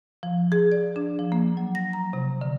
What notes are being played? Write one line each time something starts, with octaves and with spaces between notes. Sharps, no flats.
F3
G#4
D5
D4
F3
A#3
F#3
A#6
A#5
C3
D3